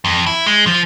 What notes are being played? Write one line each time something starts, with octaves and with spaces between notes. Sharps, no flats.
F2
E4
G#3
F3